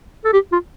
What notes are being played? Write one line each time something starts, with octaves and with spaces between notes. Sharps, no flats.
A4
G4
F4